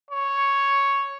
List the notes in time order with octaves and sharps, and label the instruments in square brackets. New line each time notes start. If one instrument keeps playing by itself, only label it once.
[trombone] C#5